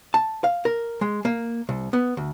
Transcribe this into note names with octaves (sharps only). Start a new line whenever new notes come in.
A5
F5
A#4
G#3
A#3
C2
B3
D2